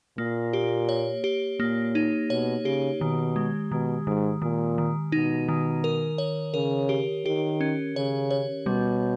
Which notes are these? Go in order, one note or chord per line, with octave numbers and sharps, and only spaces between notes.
A#2 A#3
G4
C#5
G4
A#2 A#3
D#4
B2 C#5
C#3 G4
B2 D#3
G#3
B2 D#3
G#2 D#3
A#2 D#3
D#3
B2 D#4
D#3
A#4
C#5
C#3 A#4
G4
D#3 G4
C#4
C#3 C#5
C#5
B2 G3